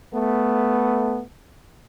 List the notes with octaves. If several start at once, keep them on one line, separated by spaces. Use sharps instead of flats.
A3 B3